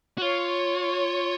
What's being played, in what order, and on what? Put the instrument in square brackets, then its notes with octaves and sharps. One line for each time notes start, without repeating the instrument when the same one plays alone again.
[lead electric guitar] F#4
[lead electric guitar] F4 [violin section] C#5